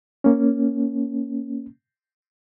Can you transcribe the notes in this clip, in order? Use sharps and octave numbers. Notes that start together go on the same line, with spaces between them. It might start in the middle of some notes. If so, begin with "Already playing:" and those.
A#3 C#4